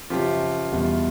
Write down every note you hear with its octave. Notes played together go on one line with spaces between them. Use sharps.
F#2 C#3 F3 F4 G4
E2 B2 G3